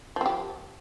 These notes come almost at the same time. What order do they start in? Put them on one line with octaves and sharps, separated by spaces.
F3 C4 G4